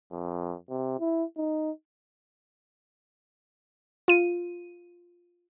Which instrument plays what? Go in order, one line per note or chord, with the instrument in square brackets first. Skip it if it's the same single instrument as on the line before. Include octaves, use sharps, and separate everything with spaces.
[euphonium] F2
C3
E4
D#4
[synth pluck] F4 D#7